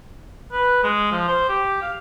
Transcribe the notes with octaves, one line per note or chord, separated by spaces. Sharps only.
B4
G#3
F3
C5
G4
F5